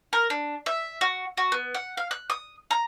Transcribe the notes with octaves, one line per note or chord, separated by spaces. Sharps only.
A#4
D4
E5
F#4
F#4
B3
F#5
F5
F#6
D#6
A#5